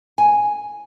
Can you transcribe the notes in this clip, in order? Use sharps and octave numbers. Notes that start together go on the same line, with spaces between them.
G#5